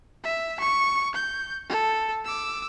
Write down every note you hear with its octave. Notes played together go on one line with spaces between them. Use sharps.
E5
C#6
G6
A4
D6 E6